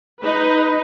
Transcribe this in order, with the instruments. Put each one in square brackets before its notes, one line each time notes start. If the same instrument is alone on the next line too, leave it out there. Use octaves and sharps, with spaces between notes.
[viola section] D#4 B4